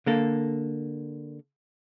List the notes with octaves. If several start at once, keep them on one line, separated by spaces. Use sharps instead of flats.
D3 A#3 A4